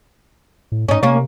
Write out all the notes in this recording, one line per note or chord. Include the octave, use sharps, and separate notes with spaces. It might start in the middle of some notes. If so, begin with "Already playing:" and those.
A2
G#2 C#4 D#4
C3 A#3 C#4